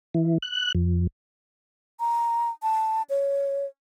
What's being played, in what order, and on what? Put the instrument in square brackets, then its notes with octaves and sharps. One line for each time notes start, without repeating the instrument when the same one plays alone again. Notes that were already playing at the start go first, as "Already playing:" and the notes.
[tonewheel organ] E3
F#6
F2
[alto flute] A#5
A5
C#5